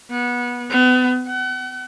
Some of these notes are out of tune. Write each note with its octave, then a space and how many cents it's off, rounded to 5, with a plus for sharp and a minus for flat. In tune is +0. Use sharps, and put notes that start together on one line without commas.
B3 -20
B3 +35
F#5 +35